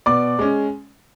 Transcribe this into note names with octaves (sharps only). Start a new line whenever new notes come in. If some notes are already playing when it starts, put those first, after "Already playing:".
B2 D5 D6
G#3 C#4